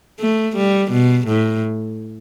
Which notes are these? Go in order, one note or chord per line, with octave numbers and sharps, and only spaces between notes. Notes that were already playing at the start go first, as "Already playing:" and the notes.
A3
G3
B2
A2